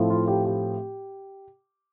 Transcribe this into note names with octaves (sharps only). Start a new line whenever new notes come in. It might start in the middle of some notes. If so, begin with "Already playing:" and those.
Already playing: A2 F3 A3 C4 E4
F4
G4
G4